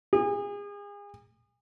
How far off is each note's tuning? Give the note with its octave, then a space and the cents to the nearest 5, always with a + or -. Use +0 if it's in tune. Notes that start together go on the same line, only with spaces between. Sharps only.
G#4 -35